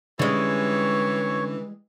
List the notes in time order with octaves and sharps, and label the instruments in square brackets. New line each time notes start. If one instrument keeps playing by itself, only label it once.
[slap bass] D3 C#4 [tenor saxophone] E3 [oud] G3 G#3 [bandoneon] C#5 C#6